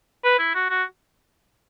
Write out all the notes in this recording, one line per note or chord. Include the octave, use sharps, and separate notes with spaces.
B4
E4
F#4
F#4